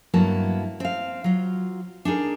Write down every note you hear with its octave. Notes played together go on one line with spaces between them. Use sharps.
G2 F#3 A#3 B3 E4 A5
C4 F5
F#3 F4
D4 D#4 G#4 A#4